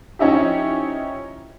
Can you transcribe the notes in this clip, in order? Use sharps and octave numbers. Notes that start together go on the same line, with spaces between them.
F3 C#4 D#4 E4 G4